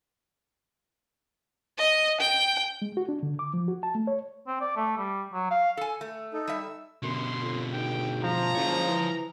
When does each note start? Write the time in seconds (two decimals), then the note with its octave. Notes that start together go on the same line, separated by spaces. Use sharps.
1.78 D#5
2.21 G5
2.82 G#3
2.97 F#4
3.09 D4
3.23 D3
3.39 D6
3.54 F3
3.68 F#4
3.83 A5
3.95 A3
4.07 C#5
4.47 C4
4.61 D5
4.77 A3
4.98 G3
5.34 F#3
5.51 F5
5.77 A4 G#5
6.01 A3
6.33 D#4 A4
6.48 G3 E5
6.60 E6
7.03 F#2 B2 D3 C6
7.42 F2
7.73 G#1 G5
8.24 F3 A#5
8.55 F#1 F4 C#5
8.88 E3